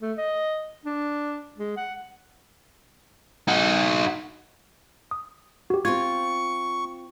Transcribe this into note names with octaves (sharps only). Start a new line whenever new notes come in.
A3
D#5
D4
G#3
F#5
D#4 F#4
D#6
F#4 G4
C4 F4 C#6 G#6